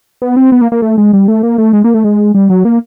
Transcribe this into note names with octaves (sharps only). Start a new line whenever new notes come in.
B3
C4
B3
A#3
A#3
A3
G#3
G3
A3
A#3
A3
G#3
A#3
A3
G#3
G3
F#3
A#3